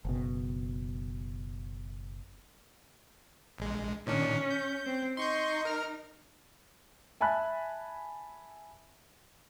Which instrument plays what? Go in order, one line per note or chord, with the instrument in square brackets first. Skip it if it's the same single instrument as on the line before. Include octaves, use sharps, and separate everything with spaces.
[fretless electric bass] F#1 B2
[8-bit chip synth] A#1 G#3
[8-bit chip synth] A#2 D#3 D4 [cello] C#4
[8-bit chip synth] G6
[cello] C4
[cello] D#4 [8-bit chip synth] C6 C#6 G6
[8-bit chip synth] A#4 F6
[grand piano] E5 G#5 A5 B5 F#6